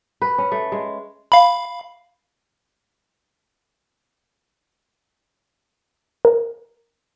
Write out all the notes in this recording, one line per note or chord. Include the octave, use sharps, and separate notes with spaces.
B4
C#4
A3
G#3
F5 B5
A#4